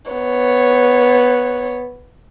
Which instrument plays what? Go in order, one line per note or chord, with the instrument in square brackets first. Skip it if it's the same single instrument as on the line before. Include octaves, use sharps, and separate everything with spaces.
[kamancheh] B3 C#5